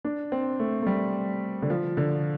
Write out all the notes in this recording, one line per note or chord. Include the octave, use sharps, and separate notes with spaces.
D4
C4
A3
A3
G3
D3
F3
D3